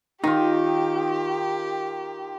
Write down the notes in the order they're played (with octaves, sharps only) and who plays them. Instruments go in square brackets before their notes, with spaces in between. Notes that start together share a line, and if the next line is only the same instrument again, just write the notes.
[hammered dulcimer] D#3 F4 [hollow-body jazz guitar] D#4 [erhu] G4